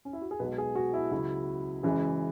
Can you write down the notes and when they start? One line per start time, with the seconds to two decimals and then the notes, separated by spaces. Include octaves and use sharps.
0.05 C#4
0.13 E4
0.21 F#4
0.31 G#4
0.39 B1 B2 G#3 B4
0.58 G#4
0.75 F#4
0.94 E4
1.11 C#2 C#3 F#3 E4
1.83 F#1 F#2 E3 G#3